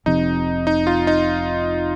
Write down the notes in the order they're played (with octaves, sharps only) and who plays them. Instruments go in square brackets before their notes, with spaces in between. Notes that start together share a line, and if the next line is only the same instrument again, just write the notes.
[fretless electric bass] F1 F2 C3 [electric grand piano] D#4
[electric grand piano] D#4
F4
D#4